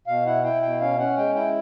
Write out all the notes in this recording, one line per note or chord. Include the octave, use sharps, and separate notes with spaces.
B2 F5
E4 F#5
E4 G5
B2 G5
C#4 F5
C#4 F#5
G#3 G5
E4 G5